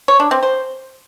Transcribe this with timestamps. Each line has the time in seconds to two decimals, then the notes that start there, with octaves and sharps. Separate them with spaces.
0.08 C#5
0.20 D4
0.31 C4
0.43 C5